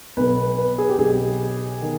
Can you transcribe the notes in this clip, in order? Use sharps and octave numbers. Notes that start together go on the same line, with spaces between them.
B1 B2 B4
B4
B4
G#4
G4
B1 B2 G#4
D#3